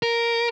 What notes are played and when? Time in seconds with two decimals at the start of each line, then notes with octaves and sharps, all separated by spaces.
0.03 A#4